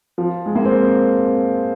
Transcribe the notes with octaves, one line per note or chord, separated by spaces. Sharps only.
F3
G#3
A#3
C4